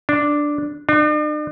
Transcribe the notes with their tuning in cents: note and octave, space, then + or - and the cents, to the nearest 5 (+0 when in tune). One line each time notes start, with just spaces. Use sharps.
D4 +0
D4 +45